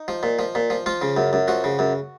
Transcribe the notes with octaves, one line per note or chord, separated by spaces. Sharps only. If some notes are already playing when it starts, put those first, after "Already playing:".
Already playing: D#4
F3
A#2
F3
A#2
F3
F3 F4
C#3
F#2
F#2
F3 F#4
C#3
F#2